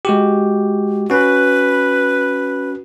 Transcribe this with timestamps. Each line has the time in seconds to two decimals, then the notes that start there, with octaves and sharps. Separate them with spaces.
0.05 G#3 F#4 G4
1.10 C#4 F#4 B4